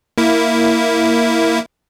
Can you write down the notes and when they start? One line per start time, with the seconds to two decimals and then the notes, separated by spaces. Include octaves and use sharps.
0.18 A#3 E4